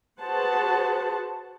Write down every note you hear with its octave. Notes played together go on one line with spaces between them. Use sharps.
F#4 G#4 B4 C5 F#5 A5